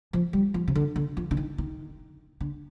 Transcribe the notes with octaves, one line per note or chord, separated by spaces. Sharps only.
F3
G3
F3
C3
D3
D3
F3
D3
D#3
D#3
D3